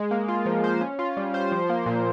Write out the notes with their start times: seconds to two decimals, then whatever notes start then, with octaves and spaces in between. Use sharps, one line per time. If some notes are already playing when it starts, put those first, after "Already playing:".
Already playing: G#3
0.11 A#3
0.28 F4
0.46 F3
0.64 C5
0.81 C#4
0.99 F4
1.17 G3
1.34 C5
1.52 F3
1.69 A#3
1.86 A#2